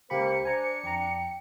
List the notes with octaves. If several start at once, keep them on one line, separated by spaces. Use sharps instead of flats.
C#2 A#3 G4 C5 B5 C#7
D4 G#5 A#5
F2 G5 A#5